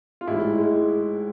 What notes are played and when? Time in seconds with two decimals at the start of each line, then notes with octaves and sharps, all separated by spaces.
0.21 F4
0.27 A1 G#2 G#3 E4
0.58 G#3